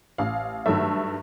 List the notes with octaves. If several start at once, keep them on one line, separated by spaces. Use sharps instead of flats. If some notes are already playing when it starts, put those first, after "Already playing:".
A1 F5
G2 D#3 F#3 A3 E5